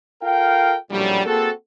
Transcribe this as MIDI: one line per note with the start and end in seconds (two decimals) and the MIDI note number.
0.22 0.76 65
0.22 0.76 69
0.22 0.76 70
0.22 0.76 77
0.22 0.76 79
0.91 1.24 34
0.91 1.24 42
0.91 1.24 45
0.91 1.24 54
0.91 1.24 55
1.25 1.49 58
1.25 1.49 60
1.25 1.49 66
1.25 1.49 68
1.25 1.49 69